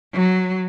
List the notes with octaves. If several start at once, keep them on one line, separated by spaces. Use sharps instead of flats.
F#3